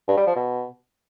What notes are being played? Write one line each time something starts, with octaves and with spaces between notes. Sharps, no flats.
G2
G3
F3
B2